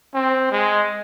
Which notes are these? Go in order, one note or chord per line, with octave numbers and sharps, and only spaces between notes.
C4
G#3